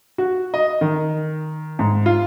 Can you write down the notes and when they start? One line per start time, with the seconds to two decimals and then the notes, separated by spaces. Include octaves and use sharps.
0.18 F#4
0.54 D#5
0.81 D#3
1.79 G#2
2.06 F4